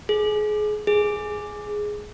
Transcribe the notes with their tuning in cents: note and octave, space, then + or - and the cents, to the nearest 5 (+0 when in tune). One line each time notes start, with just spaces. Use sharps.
G#4 +30
G#4 +5